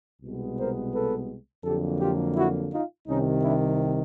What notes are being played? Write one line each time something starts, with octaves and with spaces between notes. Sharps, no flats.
C2 B2 G#3 B3
A#4 C5
A4 B4
F2 D3 F#3 A#3 G4 A4
F4 G4
E4 F#4
D#4 F4
C2 C3 D#3 C#4 D#4
D4 E4